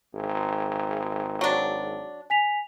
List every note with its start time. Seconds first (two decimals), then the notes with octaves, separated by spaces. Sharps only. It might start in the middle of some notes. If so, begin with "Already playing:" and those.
0.14 G#1
1.41 F#3 D4
2.30 G#5 B6 F7